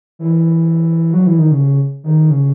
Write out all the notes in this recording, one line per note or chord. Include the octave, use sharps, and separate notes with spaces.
E3
F#3
E3
D#3
C#3
D#3
C#3